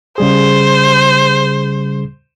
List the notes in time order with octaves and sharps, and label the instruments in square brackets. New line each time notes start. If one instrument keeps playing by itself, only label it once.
[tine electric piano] C#3 G3 G#4 [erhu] C5